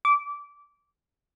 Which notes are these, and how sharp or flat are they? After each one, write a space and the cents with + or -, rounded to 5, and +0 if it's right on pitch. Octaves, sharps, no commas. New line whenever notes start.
D6 -20